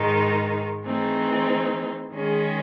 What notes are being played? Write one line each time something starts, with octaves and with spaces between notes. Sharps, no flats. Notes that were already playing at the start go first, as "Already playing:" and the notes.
Already playing: G#2 D#3 G#3 D#4
E3 A3 C4 D#4 G#4
D#3 G#3 C#4 G#4